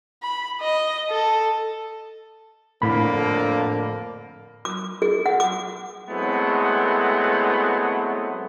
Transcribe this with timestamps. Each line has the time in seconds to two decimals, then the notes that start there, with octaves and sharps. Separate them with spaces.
0.23 B5
0.61 D#5
1.10 A4
2.82 F2 A2 D3 A#3 B5
4.65 D6
5.02 G#4
5.26 F#5
5.40 D6
6.09 F#3 G#3 A3 B3 C4 E4